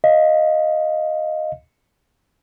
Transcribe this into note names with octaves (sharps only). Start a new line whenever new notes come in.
D#5 F5